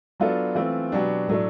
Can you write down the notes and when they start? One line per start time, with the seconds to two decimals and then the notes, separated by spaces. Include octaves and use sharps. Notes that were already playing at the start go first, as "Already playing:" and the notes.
0.20 F#3 B3 D4 F4 A4
0.55 E3 A3 C4 F4
0.92 B2 F#3 B3 D4 G4
1.28 A2 F#3 A3 D4